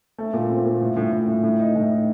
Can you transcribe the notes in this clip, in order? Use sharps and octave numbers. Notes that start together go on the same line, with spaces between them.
A3
A#2
C4
A#2
A2
A2
A2
A2
A2
D#4
A2
D#4